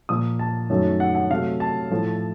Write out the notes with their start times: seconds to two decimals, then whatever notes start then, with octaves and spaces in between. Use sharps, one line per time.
0.09 A#2 F3 A#3 D#6
0.39 A5
0.70 F#2 D#3 F#3 A3
1.00 F#5
1.15 F#5
1.30 C3 F#3 A3 F5
1.60 A5
1.91 A2 F3 A3